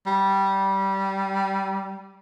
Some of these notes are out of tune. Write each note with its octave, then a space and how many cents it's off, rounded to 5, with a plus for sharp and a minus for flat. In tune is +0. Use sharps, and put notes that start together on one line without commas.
G3 -15